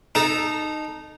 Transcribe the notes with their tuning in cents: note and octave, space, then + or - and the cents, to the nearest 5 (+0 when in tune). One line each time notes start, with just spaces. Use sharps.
D#4 -15 A4 -10 A#5 +0